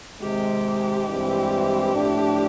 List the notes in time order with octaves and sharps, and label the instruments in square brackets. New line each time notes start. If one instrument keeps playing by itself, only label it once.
[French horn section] C3 D#3 G#3 [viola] G4
[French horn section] G2 E3 G#3 C4 E4
A2 F3 A3 D4